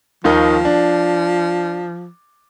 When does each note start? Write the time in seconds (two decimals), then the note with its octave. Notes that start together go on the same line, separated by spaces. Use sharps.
0.24 D#2 D#3 F3 D#4
0.65 D4